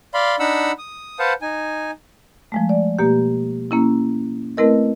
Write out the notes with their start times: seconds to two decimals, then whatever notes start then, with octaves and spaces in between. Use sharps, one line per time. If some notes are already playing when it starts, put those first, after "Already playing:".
0.14 D5 F5 B5 C6
0.39 D4 D#4 F#5 B5 E6
0.78 D#6
1.19 B4 C5 F5 F#5 A5
1.42 D#4 G#5
2.52 F3 G#3 A3
2.69 D5
2.99 B2 A#3 G4
3.71 A#3 C#4 E4
4.57 A3 C4 E4 A#4 B4 D#5